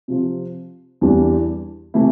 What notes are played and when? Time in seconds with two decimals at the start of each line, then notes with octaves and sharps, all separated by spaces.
0.08 C3 F3 C4 F4
1.01 E2 E3 G3 D4
1.94 C3 E3 A3 E4